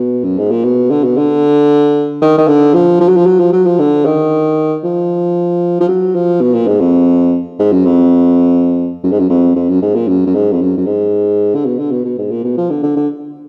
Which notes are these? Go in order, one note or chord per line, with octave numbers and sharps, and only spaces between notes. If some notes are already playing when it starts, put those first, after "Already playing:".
Already playing: B2
F#2
G#2
A#2
B2
D3
B2
D3
D#3
D#3
D3
F3
F3
F#3
F3
F#3
F3
F#3
F3
D3
D#3
F3
F3
F#3
F3
B2
A#2
G#2
F2
G#2
F#2
F2
F#2
G#2
F#2
F2
F2
F#2
G#2
A#2
F#2
F#2
G#2
F2
F#2
F#2
G#2
D3
B2
D3
B2
B2
G#2
A#2
B2
F3
D3
D3
D3